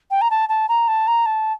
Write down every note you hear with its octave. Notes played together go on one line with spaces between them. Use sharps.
G5
A#5
A5
A5
A#5
A5
A#5
A5